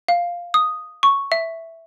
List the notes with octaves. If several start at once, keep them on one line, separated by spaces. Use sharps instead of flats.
F5
D#6
C#6
E5